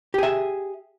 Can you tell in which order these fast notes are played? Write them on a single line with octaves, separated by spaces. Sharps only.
G4 G#4 E5